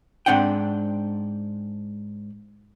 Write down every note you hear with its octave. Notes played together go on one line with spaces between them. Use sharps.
G#2 F#3 C4 D4 F#5 G5